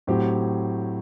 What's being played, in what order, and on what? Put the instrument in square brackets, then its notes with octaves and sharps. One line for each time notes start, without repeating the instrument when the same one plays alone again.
[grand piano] A2 F#3 C4 G4